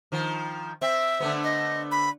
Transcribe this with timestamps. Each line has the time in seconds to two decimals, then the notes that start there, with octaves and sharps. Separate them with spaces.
0.12 D#3 F3
0.82 C4 E5
1.20 D3 A3 B3
1.44 D#5
1.91 B5